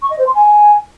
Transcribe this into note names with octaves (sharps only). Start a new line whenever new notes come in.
C#6
D#5
C5
C6
G#5